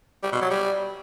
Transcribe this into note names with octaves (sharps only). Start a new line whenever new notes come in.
G3
B2
F#3
G3